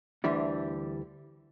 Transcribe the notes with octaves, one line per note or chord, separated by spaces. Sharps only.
D2 D3 E3 G3 D4